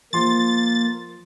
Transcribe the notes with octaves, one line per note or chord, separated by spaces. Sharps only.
F3 A#3 C6 A6